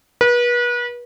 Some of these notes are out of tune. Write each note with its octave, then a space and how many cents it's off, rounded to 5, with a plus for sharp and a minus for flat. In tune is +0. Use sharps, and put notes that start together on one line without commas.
B4 -35